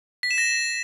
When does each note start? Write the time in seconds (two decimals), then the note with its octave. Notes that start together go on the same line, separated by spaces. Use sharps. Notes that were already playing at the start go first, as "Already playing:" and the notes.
0.23 B6
0.31 E7
0.38 A#6